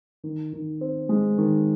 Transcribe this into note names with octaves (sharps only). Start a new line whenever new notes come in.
D#3
D#3
C4
G#3
D#3